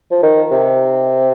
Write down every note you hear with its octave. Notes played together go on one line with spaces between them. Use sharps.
F3
D#3
C3